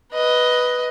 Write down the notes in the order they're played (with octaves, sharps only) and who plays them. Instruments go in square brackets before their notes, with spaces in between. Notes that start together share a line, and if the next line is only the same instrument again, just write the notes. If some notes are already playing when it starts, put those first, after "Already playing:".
[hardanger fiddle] B4 D#5